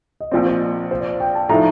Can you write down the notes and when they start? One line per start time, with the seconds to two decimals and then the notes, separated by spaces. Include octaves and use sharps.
0.20 D#5
0.32 A#1 A#2 F3 C4 D5
0.46 C5
0.91 C5
1.00 D5
1.20 G5
1.35 A5
1.49 A2 F3 A3 D#4 A#5